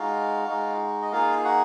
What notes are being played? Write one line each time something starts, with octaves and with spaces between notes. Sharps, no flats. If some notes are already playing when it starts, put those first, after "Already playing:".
Already playing: G#3 D#4 F4 F#4 F5
G#3 D#4 F#4
D#5
A#3 D#4 F4 G#4 F5
F#4 F#5